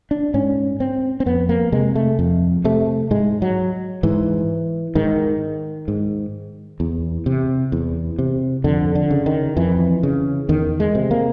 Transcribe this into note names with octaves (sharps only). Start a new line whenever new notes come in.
D4
G#2 C#4
C4
C4
F2 B3
A#3
C3 G#3
A3
F2
C3 A3
G#2 G#3
F#3
G#2 E3
G#2 D#3
G#2
E2
C3
E2
C3
F2 D3
D3
C#3
D#3
F2 E3
C#3
E2 D#3
G#3
C3
A#3